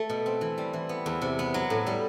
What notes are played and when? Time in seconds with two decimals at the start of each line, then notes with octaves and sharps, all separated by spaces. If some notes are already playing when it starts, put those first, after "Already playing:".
Already playing: A3
0.09 B2
0.26 C4
0.41 E3
0.58 G3
0.73 E3
0.89 B3
1.06 E2
1.22 C3
1.39 B3
1.54 F#3
1.70 A2
1.87 G3